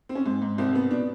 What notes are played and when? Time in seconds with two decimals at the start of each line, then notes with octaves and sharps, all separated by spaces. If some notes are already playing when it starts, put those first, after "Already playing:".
0.09 C4
0.15 C#4
0.26 G#2
0.42 G#2
0.58 C2 C4
0.75 B3
0.91 B2 D4